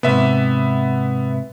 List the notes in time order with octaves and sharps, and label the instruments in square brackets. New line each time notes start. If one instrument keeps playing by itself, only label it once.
[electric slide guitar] G#2 C3 [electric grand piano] B3 E5